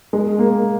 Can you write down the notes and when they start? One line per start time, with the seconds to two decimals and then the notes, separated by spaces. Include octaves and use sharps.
0.13 G#3
0.39 A#3